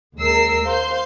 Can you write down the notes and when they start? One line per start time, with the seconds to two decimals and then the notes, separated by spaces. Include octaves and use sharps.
0.20 D#2 G#3 A#4 E6 C7
0.65 C5 F5 C6 G6